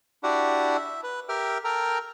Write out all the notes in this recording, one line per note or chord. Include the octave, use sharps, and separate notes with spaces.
D4 E4 F#4 G4 D5 F#5
E5
B4
G4 A#4 E5 G5 F6
A4 A#4 G5 A#5